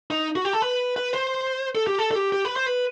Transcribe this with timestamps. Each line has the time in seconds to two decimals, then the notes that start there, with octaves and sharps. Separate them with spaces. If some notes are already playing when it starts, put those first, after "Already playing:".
0.10 D#4
0.36 F#4
0.45 G4
0.53 A4
0.62 B4
0.96 B4
1.13 C5
1.75 A4
1.87 G4
1.99 A4
2.11 A4
2.15 G4
2.32 G4
2.45 B4
2.56 C5
2.66 B4